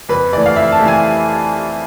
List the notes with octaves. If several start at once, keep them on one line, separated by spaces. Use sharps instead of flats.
F2 B4
E3 A3 D5
F5
F2 E5
A5
E3 A3
G#5